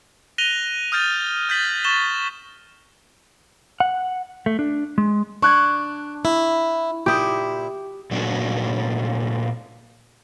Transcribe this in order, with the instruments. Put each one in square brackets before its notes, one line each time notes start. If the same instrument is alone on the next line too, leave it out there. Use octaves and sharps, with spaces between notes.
[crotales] F#6 A#6 D#7 F7 G7
D#6 F6 G6 A6 D#7
F6 G6 A6 B6 F#7
C#6 A6 E7 G7
[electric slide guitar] F#5
A3
D4
G#3
[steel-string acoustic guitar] D4 [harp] C#6 F#6 G#6
[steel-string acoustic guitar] E4
[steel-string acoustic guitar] A#2 E4 [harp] G4 D#6
[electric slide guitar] A#2 F#3 A3 D4 D#4 F#4